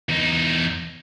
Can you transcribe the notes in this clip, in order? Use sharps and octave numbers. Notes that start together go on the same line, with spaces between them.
E2 D#4